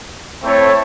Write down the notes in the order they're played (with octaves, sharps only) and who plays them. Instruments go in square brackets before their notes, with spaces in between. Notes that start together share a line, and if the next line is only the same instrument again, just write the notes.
[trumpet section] A3 C4 E4 A4 C#5